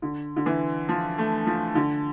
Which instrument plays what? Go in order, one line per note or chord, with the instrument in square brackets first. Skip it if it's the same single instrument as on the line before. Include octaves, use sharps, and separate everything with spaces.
[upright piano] D3
D3
E3
F3
A3
F3
D3